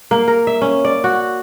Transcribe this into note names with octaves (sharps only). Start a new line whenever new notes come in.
A#3
A#4
E5
C#4
D5
F#4